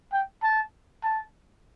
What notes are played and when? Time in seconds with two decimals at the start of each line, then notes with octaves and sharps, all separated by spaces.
0.12 G5
0.43 A5
1.03 A5